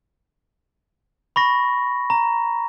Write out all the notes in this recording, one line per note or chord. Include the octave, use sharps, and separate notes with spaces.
B5 C#6 A#6
A#5